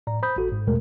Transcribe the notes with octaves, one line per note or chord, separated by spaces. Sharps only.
A2 D5 A#5
C5 B5 D#6 G6
G#1 F#4 A4
G#2
E2 B2 G#3 A3 A#4